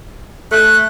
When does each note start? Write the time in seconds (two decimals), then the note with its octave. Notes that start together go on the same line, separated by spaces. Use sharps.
0.52 A3 F#6